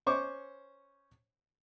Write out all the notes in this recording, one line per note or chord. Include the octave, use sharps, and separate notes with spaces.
C#4 C5 C#6 D6